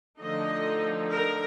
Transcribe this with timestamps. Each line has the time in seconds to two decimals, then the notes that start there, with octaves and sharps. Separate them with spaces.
0.20 D3 F3 A3 D#4 D#5
1.12 A#4